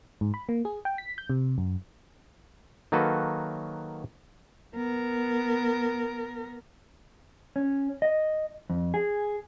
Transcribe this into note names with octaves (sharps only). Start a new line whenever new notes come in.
G#2
B5
A#3
G#4
G5
B6
G6
C3
F#2
D#3 F#3 A#3 F#4 A4 B4
B3 A#4
C#4
D#5
F2
G#4